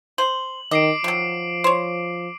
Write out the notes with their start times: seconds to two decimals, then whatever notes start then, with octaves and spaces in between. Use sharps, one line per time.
0.18 C5 F#7
0.71 D#3 D#5 D6 C7 D7
1.04 D#3 F3 F#3
1.64 C5 C#5